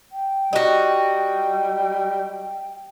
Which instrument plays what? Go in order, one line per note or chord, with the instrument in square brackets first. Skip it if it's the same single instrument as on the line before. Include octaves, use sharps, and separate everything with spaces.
[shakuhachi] G5
[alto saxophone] G3 [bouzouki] D#4 F#4